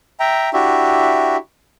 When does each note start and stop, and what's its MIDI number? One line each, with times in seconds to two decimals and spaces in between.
0.20 0.49 76
0.20 0.49 79
0.20 0.49 82
0.53 1.37 62
0.53 1.37 64
0.53 1.37 66
0.53 1.37 67
0.53 1.37 76